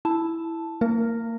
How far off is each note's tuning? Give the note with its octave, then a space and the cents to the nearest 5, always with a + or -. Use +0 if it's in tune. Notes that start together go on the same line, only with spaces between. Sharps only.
E4 +0 A5 +0
A#3 -35 A#4 +0